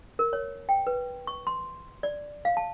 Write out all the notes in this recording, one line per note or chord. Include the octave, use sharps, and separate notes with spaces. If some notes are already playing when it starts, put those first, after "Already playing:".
A#4
C#5
G5
B4
C#6
C6
D5
F5
A5